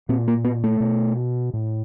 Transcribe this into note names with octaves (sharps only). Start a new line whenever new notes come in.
A#2 C4
A#3
B3
A3
B2
A2